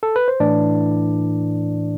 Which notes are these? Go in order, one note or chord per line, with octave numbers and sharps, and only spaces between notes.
A4
B4
C5
A2 E3 D4 D5